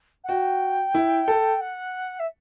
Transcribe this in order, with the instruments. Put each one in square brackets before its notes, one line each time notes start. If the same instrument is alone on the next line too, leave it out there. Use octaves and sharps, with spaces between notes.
[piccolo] F#5
[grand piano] F#4 [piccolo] G5
[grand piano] E4
A4
[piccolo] F#5
E5